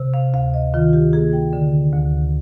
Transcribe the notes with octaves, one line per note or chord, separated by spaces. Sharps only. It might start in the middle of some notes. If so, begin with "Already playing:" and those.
Already playing: C3
F5
D2 F5
D#5
D#3 F4
G4
A#3 G#4
G5
D3
D2